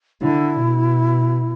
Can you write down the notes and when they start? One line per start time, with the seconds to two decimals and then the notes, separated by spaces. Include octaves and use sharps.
0.21 D3 E4
0.60 B2